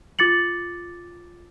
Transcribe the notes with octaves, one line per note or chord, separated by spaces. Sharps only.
F4 D6 A6 C#7 F#7